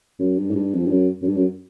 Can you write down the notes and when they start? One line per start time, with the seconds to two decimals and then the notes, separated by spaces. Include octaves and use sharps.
0.19 F#2
0.38 G2
0.51 G#2
0.55 G2
0.74 F2
0.86 G2
0.91 F#2
1.22 F#2
1.27 G2
1.37 F#2